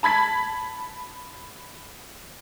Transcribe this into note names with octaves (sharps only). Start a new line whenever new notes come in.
A5 B5 G#6 B6